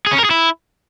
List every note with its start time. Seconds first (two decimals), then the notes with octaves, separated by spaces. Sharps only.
0.06 G#4
0.13 C#4
0.19 A#4
0.25 G#4
0.31 E4